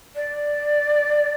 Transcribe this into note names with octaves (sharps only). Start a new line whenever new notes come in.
D5